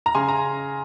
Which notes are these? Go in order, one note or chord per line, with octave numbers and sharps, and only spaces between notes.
A#5
C#3 G#5 C6
A#5